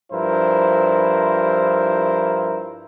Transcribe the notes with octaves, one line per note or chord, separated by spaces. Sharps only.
G2 F3 E4 A#4 C5